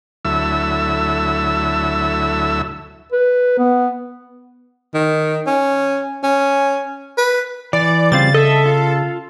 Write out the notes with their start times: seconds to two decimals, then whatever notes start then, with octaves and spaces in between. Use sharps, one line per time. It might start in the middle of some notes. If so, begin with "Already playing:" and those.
0.25 D2 F#3 E4 A4 E5 E6
3.12 B4
3.59 B3
4.94 D#3
5.47 C#4
6.23 C#4
7.18 B4
7.73 E3 D5
8.12 C#3 G3 C4 F4 A6
8.34 A4 D#5 E5
8.66 F4